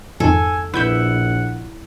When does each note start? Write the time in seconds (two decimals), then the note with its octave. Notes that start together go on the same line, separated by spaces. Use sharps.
0.20 F2 G#2 D#3 A4 G#5
0.74 A#1 E4 B4 E5 F#5 G6